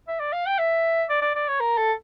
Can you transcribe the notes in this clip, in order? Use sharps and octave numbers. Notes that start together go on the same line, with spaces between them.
E5
D5
F5
G5
E5
D5
D5
D5
C#5
A#4
A4